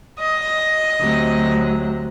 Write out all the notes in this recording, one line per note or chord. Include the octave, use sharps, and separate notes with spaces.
D#5
D2 C3 F#3